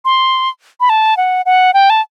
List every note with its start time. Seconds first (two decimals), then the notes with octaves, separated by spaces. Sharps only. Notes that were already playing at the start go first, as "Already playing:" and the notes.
0.05 C6
0.80 B5
0.90 A5
1.17 F#5
1.46 F#5
1.74 G5
1.90 A5